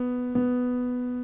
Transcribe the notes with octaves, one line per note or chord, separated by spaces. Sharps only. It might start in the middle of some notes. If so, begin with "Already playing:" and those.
Already playing: B3
B3